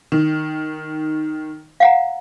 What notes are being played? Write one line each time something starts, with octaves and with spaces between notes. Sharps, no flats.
D#3
F5 F#5 A#5